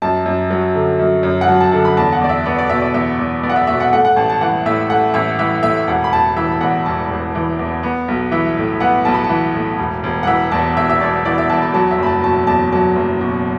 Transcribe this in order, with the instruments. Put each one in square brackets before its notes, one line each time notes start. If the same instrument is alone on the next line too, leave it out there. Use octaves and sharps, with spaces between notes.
[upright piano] F#2 A5
F#2
F#3
D3
F#2
F#2
F#5
F#3 A5
A5
D3 A5
B5
E2 A5
F#5
E2 D5
E5
B3 D5
D5
B2 E5
D5
E2 E5
E2
B3 D5
F#5
E5
B2 E5
F#5
A3 F#5
F#5
A1 A5
A5
E3 F#5
A2 E5
A3 F#5
A1 E5
E3 E5
A2 E5
E1 F#5
B5
E1 A5
E3 E5
E2 F#5
E1 A5
E1
E3
E2
B3
B1
E3 E5
A2
B3 F#5
B1 A5
B5
A5
E3
A2
E1
E1
F#5
E3 E5
E2 A5
E1 E5
E5
E1 D5
E3 D5
E5
E2 A5
B5
F#3 A5
E5
F#1 B5
A5
B2 A5
E2 A5
F#3 A5
F#1
B2